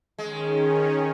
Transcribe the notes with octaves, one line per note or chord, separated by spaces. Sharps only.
D#3 G#3 C#4